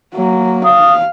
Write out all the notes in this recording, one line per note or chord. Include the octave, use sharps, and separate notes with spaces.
F#3 A#3
F5 D#6